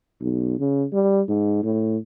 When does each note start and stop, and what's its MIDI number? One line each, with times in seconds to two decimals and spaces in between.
0.21 0.59 35
0.60 0.85 49
0.93 1.21 55
1.28 1.58 44
1.63 1.97 45